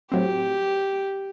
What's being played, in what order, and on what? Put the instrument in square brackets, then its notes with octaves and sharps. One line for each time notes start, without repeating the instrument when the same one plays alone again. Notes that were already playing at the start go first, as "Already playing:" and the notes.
[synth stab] A2 F#3 C4 [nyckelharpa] G4